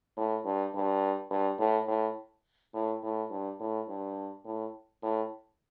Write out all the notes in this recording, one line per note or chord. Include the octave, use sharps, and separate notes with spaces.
A2
G2
G2
G2
A2
A2
A2
A2
G2
A2
G2
A2
A2